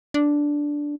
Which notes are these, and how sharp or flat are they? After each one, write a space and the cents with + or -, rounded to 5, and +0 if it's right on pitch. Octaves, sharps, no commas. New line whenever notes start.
D4 -5